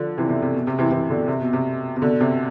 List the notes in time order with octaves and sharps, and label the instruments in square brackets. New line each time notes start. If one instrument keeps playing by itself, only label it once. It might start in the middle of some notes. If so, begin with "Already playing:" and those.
Already playing: [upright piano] D3 F3
C3 E3
C3
C3
B2
C3
C3 E3
C3 E3
B2 D3
C3
B2
C3
C3
B2 D3
C3